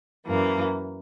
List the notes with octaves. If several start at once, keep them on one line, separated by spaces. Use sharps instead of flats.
F#2 E3 A#3